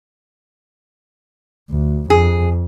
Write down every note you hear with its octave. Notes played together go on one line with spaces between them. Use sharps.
D2
F2 G#4